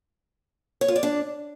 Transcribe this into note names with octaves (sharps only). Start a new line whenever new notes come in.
C#5
F4
D5
D4